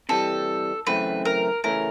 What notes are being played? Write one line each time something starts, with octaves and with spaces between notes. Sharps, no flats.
C3 E3 G3 A4
F#2 C#3 E3 A3 C4 B4
A#4
C#3 E3 A3 C#4 A#4